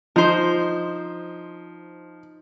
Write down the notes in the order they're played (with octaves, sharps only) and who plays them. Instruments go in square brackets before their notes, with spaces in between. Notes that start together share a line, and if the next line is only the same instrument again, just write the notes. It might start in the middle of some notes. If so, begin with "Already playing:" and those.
[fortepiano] F3 [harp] D#4 C5